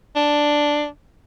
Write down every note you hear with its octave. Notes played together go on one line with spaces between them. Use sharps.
D4